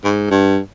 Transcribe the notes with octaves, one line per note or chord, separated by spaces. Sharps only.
G#2
G2